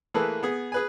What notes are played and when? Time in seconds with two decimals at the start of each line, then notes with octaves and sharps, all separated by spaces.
0.14 E3 A3 A#3 G#4 A4 B4
0.43 B3 G#4
0.72 G#4 B4 G#5